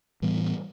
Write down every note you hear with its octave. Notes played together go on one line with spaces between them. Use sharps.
A2 E3 G3 B3